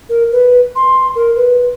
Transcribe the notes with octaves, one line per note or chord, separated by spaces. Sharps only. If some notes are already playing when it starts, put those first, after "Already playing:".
A#4
B4
C6
A#4
B4